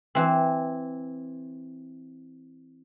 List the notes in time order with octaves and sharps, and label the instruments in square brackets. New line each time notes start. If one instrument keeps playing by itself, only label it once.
[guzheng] E3 C4